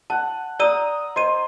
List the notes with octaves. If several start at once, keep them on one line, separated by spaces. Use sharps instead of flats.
F#5 A5
D5 A#5 D#6 E6 D#7
C5 D#5 D#7